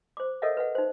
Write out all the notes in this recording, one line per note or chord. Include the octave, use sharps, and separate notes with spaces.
C5 D6
A4 A#4 C#5 D#5 E5 F#5
B4 F#5
D#4 C5